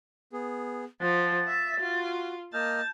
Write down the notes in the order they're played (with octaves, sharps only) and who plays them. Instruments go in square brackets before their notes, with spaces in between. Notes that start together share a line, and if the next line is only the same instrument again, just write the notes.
[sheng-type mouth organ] B3 G#4
[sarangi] F3 [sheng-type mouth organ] F#5 [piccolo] A6
[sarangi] E5
[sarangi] F4 [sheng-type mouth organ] F#4
[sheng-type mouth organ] A#3 D#5 F6 [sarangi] A5 [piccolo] G6